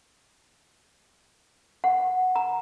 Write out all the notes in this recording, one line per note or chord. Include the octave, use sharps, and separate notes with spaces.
F#5
A#5